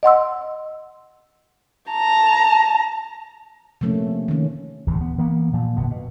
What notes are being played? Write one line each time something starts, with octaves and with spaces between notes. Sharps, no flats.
D#5 F#5 C6 E6
A5 A#5
C3 F3 A3 A#3 C#4
D#3 C#4
D1 D2 C3 E3
B3
E3 A#3 B3
A#2 F3
F1 B2 D3 B3
B2